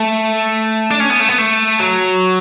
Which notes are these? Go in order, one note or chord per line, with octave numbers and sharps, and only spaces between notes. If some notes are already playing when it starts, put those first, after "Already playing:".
Already playing: A3
D4
C#4
B3
A3
B3
A3
F#3